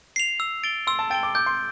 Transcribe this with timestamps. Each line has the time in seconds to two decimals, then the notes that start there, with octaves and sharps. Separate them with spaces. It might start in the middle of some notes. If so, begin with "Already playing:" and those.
0.16 C7 F7
0.40 E6
0.63 A6 D7 G7
0.87 C6 E6
0.99 A5
1.10 G5 A6 D7 G7
1.23 D6
1.35 D6 G6
1.46 C6